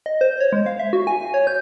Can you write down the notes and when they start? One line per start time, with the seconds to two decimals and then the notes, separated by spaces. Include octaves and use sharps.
0.06 D#5
0.21 C5
0.40 C#5
0.53 G#3
0.66 F5
0.79 E5
0.93 F#4
1.07 G#5
1.20 G#5
1.34 C#5
1.47 G6